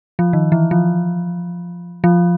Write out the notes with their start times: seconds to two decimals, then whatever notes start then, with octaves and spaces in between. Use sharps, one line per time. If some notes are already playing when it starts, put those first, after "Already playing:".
0.19 F3
0.33 D#3
0.52 E3
0.71 F3
2.04 F3